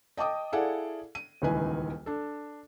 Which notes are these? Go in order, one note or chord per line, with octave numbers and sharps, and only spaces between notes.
D#5 G5 A5 D6 D#6
E4 G#4 A4 D5 F5 F#5
D#7
D#1 C#2 D#3 E3 B4 G#5
D4 A4